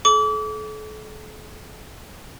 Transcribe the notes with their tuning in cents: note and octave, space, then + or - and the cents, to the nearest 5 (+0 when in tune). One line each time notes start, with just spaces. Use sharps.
A4 -40 D6 -35